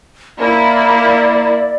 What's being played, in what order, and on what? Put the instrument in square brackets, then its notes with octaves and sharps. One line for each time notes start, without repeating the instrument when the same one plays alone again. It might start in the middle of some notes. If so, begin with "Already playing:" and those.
[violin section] A#3 E4 [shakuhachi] D5